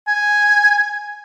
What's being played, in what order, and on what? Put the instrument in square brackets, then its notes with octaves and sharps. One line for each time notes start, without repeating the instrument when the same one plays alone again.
[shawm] G#5